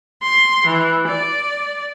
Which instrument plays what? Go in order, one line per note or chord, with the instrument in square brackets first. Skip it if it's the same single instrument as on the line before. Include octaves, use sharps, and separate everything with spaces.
[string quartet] C6
E3
D5